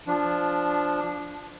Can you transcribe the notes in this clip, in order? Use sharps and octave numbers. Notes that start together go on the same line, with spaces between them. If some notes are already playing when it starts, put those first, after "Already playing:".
F3 D4